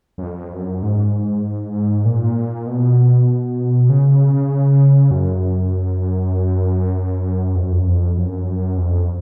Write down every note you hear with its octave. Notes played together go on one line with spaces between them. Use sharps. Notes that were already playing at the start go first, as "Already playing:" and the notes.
F#2
F2
F#2
G#2
A#2
B2
C#3
F#2
F2
F#2
F2
F#2
F2
F#2
F2